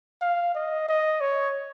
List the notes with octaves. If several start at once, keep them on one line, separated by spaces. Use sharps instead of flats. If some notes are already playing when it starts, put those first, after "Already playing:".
F5
D#5
D#5
C#5